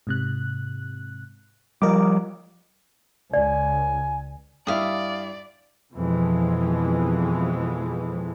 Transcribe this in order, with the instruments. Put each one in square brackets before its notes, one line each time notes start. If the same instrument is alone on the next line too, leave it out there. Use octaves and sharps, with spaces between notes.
[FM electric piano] G#2 C3 F#6
[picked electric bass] F3 G3 [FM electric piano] A#4 D#5 D6
[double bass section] C#2 [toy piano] D5 [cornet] G#5
[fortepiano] G2 E4 [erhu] D5 [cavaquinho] F5 D#6
[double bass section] F2 B2 E3 F3 G#3